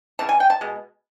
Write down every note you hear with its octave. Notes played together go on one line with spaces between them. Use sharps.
C#3 E3 A5
G#5
G5
A5
B2 G#3